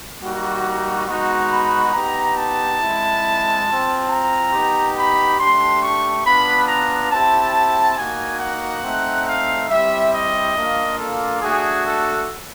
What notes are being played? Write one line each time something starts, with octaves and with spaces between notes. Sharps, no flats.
G3 A#3 D#4 F#4
G#3 B3 D#4 F#4
B5
B3 D#4 G4 A#5
A5
G#3 C4 E4
C4 F4
A#5
B3 D#4 G4
B5
A3 D4 G4 C6
C#6
B3 D4 F4 B5
A#5
C4 E4 G4 A5
A#3 D#4 F#4 G#5
F#5
A3 C4 D#4
F5
G3 C4 E4 G4 E5
D#5
A#3 D4 F4
A4
A3 D4 F#4 G#4
A4